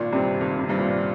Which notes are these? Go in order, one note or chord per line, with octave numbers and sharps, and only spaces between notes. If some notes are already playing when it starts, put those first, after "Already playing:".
Already playing: G#1 A#2
G2 C3 G3 C4
G#1
C3
G2 G3 C4
A#2